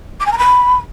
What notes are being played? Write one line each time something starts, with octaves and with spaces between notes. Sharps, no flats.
D6
G#5
A#5
B5